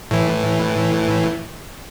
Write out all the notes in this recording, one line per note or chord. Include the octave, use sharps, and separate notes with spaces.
A2 E3